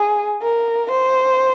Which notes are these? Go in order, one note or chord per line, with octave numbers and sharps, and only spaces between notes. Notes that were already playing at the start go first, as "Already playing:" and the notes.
Already playing: G#4
A#4
C5